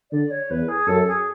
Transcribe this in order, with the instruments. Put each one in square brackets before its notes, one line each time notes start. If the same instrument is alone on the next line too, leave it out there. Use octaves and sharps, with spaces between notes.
[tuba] D3 [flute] D5
[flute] C#5
[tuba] E2 [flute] B4
[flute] G#4
[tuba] F#2 [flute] A4
[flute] G#4